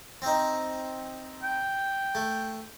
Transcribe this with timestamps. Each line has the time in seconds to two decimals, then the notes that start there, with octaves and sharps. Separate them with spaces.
0.22 C4 D#4
1.43 G5
2.15 A3